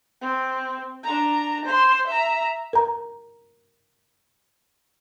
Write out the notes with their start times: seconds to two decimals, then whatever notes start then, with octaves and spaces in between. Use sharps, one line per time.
0.22 C4
1.03 D4 A#5
1.65 C5 C6
2.07 E5 A#5
2.73 A#4 A#5